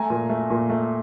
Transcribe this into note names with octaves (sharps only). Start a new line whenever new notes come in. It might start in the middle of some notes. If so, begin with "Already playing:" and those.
Already playing: A3 G#5 A#5
A#2
A3
A#2
A3